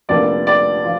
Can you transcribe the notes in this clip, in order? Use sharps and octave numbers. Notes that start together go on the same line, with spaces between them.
F1 F2 D3 A#3 D5
D5
F3 F4